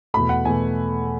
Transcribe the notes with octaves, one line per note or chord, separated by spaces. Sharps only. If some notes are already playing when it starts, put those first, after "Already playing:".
E2 B2 A3 B5
F#5
E2 B2 A3 G#5